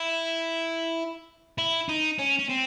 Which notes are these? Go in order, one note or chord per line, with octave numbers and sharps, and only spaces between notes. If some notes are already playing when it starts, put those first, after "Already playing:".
Already playing: E4
E4
D#4
C#4
C#4
C4